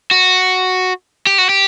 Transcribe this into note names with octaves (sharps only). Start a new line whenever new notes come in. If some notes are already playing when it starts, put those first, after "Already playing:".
F#4
G4
F#4
G4